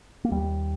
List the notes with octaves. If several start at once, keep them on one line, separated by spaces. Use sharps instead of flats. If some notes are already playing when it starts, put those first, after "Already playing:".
A#3
D#2 G3